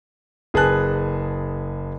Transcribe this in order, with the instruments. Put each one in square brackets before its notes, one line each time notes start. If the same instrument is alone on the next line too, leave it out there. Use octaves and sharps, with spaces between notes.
[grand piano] F#1 G#4 B4 A5 F#6